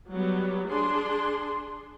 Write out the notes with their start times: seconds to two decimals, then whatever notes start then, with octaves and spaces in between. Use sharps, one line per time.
0.11 F#3 G3 B3
0.69 D4 G#4 C6